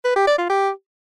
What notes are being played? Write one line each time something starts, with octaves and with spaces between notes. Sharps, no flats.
B4
G4
D5
F4
G4